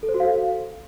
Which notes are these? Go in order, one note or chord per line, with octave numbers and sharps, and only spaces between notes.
A4
C5
F#4
F5
A4